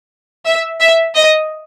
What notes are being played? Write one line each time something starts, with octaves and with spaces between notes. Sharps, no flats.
E5
E5
D#5